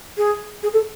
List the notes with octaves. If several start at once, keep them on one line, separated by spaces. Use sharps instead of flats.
G#4
G#4
A4